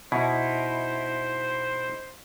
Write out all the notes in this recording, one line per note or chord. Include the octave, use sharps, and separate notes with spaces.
B2 D#4 E4 C5